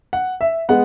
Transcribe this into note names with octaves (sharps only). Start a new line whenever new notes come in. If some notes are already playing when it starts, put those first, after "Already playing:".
F#5
E5
G#3 B3 F#5